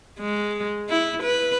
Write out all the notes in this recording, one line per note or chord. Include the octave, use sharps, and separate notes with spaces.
G#3
E4
B4